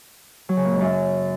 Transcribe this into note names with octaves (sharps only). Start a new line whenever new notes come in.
F#3
C#3
A#2
G#2
F#2